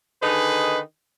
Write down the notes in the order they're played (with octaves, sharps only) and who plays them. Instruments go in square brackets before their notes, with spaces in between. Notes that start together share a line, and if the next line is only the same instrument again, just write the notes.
[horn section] D3 D#3 D#4 G#4 B4